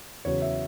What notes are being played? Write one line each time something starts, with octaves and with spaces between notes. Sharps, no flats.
E2 C#3 F#3 C#5
E5